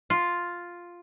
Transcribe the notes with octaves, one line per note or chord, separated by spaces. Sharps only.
F4